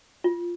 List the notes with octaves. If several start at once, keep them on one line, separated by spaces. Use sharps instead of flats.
F4